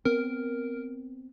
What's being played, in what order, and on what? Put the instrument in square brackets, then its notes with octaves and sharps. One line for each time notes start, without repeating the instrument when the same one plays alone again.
[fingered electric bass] B3 C4 [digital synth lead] A#4